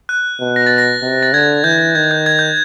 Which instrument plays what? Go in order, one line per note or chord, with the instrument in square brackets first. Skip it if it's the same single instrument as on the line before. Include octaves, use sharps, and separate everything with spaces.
[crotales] F#6
[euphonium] B2
[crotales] A#6
A6
A#6
[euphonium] C3
[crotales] A6
[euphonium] D3 [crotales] G#6
[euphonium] E3 [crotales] G6
[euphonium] D#3 [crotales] G#6
[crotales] G6
G#6
G6